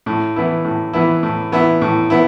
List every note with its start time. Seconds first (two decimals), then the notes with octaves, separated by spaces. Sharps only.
0.06 A2
0.36 E3 B3 E4
0.65 A2
0.93 E3 B3 E4
1.23 A2
1.52 E3 B3 E4
1.81 A2
2.10 B3 E4